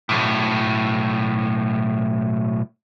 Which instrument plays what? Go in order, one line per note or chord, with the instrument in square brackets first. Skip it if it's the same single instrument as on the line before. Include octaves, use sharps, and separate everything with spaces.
[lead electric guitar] B1 A2